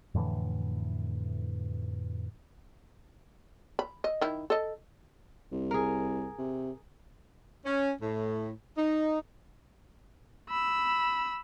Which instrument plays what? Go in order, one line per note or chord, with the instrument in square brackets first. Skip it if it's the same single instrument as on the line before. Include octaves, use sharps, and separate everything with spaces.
[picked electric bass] F2 A2 D3 E3
[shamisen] B5
D#5
D#3 E4
A4 D#5
[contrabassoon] C2
[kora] G#4 A#4
[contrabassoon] C3
[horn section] C#4
A2
D#4
[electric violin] B5 E6